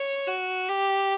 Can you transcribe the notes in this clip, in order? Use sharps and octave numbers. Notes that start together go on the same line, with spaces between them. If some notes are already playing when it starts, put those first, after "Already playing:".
Already playing: C#5
F#4
G4